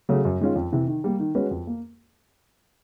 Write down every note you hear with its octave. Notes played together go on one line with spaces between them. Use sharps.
C#3 F#3 A3
F#2
D#3 G#3 C#4 F4
F2
C3 E3
D#3
G3 A#3
D#3
G#3 C#4 F#4 B4
F2
A#3